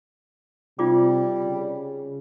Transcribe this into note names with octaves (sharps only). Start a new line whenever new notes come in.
C3 G3 D#4 F4 D6
C#3